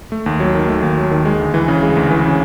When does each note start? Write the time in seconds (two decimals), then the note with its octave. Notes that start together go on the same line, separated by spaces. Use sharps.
0.12 A3
0.26 D#2
0.40 F#3
0.55 D#3
0.69 A3
0.82 D#2
0.97 F#3
1.11 D#3
1.25 G#3
1.40 D2
1.54 E3
1.68 C#3
1.83 G#3
1.97 D2
2.11 E3
2.25 C#3